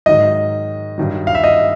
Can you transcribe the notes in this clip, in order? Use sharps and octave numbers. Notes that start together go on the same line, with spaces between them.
G#2 D#3 F#3 D#5
G2 D#3 F#3
F5
E5
D#5